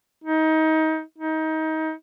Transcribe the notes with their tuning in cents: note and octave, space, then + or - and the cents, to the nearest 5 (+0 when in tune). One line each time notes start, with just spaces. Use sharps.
D#4 +25
D#4 +25